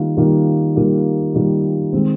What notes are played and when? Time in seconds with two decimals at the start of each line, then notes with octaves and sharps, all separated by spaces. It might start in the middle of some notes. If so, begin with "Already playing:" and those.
Already playing: D#3 G3 A#3 F4
0.17 D#3 G3 A#3 F4
0.76 D#3 G3 A#3 F4
1.34 D#3 G3 A#3 F4
1.93 D#3 G#3 C4